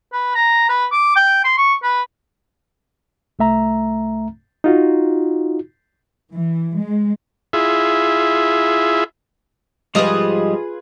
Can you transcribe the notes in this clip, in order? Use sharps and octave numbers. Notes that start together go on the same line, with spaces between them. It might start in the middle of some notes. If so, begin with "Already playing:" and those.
B4
A#5
B4
D6
G5
C6
C#6
B4
C2 A3 E5 A#5
D#4 F4 F#4
E3
G#3
E4 F4 G#4 E5
G#2 F3 G3 F4 G#4 B4 D5 D#5